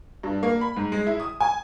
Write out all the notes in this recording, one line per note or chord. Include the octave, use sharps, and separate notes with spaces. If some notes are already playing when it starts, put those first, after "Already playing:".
G2
A#3
B5
G#2
G#3
E4
D#6
G#5